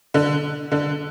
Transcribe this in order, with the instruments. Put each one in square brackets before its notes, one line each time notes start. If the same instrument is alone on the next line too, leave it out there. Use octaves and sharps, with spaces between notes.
[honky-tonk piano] D3
D3